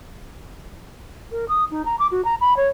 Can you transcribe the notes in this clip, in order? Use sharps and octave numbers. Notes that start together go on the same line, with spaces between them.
A#4
D#6
D#4
A#5
D6
F#4
A#5
B5
C#5